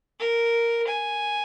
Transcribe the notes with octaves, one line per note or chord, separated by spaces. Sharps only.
A#4
G#5